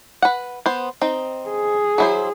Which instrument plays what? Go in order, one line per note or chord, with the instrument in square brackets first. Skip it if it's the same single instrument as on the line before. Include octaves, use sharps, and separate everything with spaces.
[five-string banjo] B4 F#5
B3 C5
C4 D#4
[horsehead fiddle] G#4
[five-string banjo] F#3 E4 C5